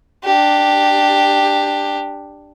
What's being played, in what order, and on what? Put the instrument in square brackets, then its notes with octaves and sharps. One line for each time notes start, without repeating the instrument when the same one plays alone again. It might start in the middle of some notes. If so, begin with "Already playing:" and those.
[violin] D4 G4